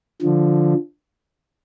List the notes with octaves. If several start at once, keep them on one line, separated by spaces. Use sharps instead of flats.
D3 F3